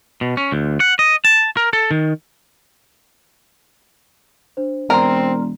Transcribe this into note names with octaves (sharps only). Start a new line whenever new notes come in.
B2
C#4
D2
F#5
D#5
A5
A#4
A4
D#3
D4 C5
E1 C4 A#4 D5 A#5 C6